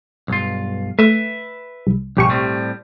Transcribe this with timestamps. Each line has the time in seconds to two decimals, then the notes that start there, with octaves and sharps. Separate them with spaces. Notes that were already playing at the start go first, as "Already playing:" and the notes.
0.28 B1 G2 F4
0.99 A3 B4 E5
1.87 C2
2.17 B1 G2 C#3 F3 G4 C#6
2.29 A2 G3 C4